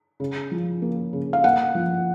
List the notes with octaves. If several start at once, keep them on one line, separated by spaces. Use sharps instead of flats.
C#3
F3
A#3
C#3
F5
A#3 F#5
F3